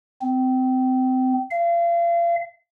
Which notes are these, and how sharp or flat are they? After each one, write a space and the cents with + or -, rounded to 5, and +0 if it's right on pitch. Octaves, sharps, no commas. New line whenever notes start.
C4 -25
F5 -35